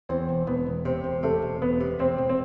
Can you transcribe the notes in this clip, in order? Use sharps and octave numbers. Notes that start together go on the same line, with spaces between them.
E2 C4
E1
E1 B3
E1
C3 C4
E1
C3 A3
E1
E1 B3
C3
E1 C4
E1
C4